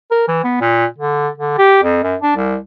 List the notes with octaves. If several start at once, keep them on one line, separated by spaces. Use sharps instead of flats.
A#4
E3
B3
A#2
D3
D3
G4
F2
F#2
D4
C2